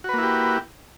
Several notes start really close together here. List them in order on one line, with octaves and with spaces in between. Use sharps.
F#4 B4 A#3 E4 G4